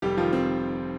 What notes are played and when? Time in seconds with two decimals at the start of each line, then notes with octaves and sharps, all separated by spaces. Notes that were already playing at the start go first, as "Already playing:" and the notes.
0.02 F1 G3 G4
0.17 D#3 F3 F4
0.33 C4